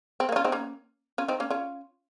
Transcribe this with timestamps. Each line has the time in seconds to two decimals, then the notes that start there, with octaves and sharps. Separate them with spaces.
0.20 C4
0.29 A#3
0.32 D#4
0.36 C#4 F4
0.44 C4 D#4
0.52 A#3 C#4
1.18 C#4 F4
1.28 C4 D#4
1.40 A#3 C#4
1.50 C#4 F4